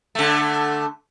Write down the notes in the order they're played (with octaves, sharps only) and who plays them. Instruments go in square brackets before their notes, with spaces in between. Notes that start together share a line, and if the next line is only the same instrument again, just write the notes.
[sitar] D3 A3